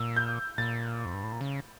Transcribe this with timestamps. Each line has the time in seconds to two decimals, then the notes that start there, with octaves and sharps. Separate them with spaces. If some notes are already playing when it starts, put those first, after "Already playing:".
Already playing: A#2 E6
0.16 G6
0.58 A#2 A6
1.05 F2
1.14 G2
1.23 A2
1.32 A#2
1.41 C#3